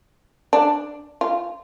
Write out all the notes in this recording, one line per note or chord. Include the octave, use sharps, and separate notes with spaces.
D4
F4